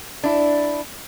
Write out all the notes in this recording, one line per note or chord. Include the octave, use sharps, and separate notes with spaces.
D4 E4